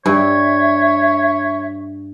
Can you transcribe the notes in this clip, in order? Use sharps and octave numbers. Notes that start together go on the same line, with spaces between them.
G2 C#5 E5